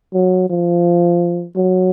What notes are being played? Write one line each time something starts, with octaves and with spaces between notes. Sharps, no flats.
F#3
F3
F#3